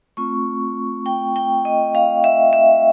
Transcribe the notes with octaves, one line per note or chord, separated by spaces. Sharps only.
A3 C4 F4 C#6
G5
G5
D#5
F5
E5
E5